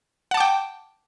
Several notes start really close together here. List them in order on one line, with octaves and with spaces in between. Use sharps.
F#5 A5 D6 G5